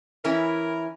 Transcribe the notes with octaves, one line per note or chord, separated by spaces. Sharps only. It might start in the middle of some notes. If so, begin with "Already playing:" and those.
E3 C#4 E4 A#4